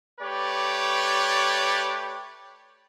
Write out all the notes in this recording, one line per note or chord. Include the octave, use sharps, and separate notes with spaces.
A3 G4 B4 C#5 D5